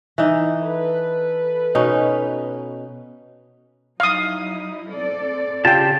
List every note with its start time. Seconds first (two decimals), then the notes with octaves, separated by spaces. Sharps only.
0.18 E3 D#4
0.61 A4 B4
1.75 B2 C#4 D#4
4.00 F#3 D#4 E4 F5 D#6
4.91 C4 A4 D5
5.65 C#3 F4 G4 G5 A5